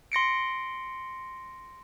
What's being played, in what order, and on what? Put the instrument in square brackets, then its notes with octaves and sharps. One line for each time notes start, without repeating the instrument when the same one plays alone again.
[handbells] C6 A#6 C#7 D7